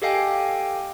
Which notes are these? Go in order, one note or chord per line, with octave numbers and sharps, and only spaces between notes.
G4 A4 D#5 F5 G5 G#5